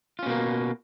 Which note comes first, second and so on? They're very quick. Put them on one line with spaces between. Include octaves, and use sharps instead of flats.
F4 C#4 B2 A#3